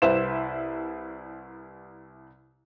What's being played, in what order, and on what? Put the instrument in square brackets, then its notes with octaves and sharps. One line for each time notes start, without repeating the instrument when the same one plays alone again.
[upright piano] C2 E4 B4 C5 E7